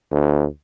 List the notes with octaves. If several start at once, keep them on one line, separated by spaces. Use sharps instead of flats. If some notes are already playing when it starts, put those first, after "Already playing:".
D2